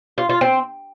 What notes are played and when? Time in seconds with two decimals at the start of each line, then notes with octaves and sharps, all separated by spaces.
0.18 F4
0.29 F4
0.41 C4